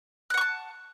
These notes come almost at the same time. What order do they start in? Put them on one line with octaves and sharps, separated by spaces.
F#6 F#5 C#6 A5